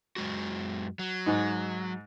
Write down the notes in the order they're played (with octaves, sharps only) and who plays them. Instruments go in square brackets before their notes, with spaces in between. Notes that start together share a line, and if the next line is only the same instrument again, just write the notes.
[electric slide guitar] F#2 G#3 F#4
F#3
[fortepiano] G#2 D#4